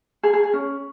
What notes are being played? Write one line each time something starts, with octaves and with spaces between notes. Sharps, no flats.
G#4
G#4
G#4
C#4